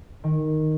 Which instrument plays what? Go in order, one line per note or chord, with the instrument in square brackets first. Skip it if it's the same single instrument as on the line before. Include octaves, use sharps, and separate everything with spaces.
[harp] D#3